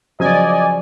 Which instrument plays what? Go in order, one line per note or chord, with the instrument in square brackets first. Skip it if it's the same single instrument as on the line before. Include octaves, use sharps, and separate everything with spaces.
[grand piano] C#3 F3 F#3 [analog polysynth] D5 G#5 [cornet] D#5